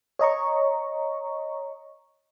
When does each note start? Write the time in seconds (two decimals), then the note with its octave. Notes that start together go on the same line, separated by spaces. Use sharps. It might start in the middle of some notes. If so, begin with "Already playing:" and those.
0.19 C#5 D#5 A#5 C#6